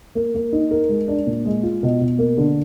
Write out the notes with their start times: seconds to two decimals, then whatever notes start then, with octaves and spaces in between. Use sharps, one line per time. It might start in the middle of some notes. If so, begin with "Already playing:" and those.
0.15 A#3
0.35 A#3
0.53 D#4
0.71 A#4
0.89 G#3
1.08 D4
1.27 A#2
1.45 G#3
1.63 F4
1.83 B2
2.01 B2
2.19 A#3
2.37 D3